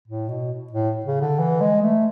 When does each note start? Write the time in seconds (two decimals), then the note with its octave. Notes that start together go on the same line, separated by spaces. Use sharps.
0.08 A2
0.29 B2
0.73 A2
1.06 C#3
1.22 D3
1.39 E3
1.61 G#3
1.82 A3